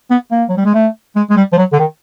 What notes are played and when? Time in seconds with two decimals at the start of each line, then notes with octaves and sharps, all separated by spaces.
0.10 B3
0.31 A#3
0.49 F#3
0.57 G3
0.65 G#3
0.74 A3
1.16 G#3
1.30 G#3
1.36 G3
1.53 F3
1.57 F#3
1.73 D3
1.79 D#3